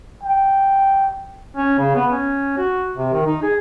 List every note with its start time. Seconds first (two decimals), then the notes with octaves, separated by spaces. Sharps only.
0.23 G5
1.56 C#4
1.78 C#3
1.95 B3
2.12 C#4
2.57 F#4
2.97 C3
3.13 D#3
3.26 D#4
3.43 G#4